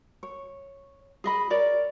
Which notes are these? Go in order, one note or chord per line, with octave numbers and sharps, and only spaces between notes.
C#5
G#4 D#5 B5
A#4 C#5 D5